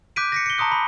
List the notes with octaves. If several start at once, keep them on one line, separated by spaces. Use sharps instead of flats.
D6 F#6 G6 B6 D7 D#7
A#6 B6 C#7
C#7 G7
A5 A#5 C6 D#6 F#6
B5